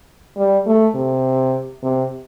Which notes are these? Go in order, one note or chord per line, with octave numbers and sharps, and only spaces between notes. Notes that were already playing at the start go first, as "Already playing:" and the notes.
G3
A3
C3
C3